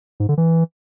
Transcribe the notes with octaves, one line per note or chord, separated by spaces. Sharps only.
G#2
D3
E3